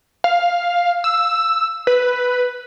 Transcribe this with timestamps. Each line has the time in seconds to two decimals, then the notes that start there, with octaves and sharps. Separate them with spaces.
0.24 F5
1.04 E6
1.87 B4